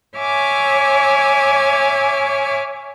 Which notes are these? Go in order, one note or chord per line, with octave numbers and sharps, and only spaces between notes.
C#5 E5 G#5 D6 F6